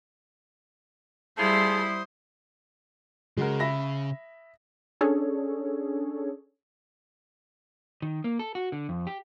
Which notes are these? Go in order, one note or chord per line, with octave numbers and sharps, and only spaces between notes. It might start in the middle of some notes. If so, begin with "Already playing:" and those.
G3 A3 E4 F4 G#4 C5 C6 D#6
C#3 G#3 F#4 A#4
E5 B5 A#6
C#4 D4 G#4 A4 C#5
D#3
A#3
A4
F#4
D3
F2
G4